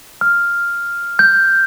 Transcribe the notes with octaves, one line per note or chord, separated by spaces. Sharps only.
F6
G6